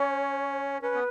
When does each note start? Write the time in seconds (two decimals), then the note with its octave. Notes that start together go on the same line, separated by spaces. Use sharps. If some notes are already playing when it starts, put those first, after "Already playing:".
Already playing: C#4 C#5
0.82 C#4 B4
0.95 B3